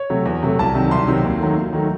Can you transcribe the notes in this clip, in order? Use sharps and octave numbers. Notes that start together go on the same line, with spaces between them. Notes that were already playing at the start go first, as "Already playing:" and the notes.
Already playing: C#5
C3 F#3 A3
E2
C3 F#3 A3
C2 A5
C3 D#3 F#3
C2 C6
C3 D#3 F#3
D#2
D#3 F#3 A3
D#2
D#3 F#3 A3